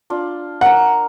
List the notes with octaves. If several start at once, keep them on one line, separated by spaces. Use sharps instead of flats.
D4 F4
A#4 F#5 A#5